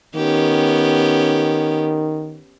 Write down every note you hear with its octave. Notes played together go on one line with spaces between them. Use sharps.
D#3 B3 C#4 G4